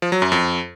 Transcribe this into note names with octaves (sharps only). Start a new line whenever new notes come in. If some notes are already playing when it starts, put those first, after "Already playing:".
F3
F#3
F#2
F2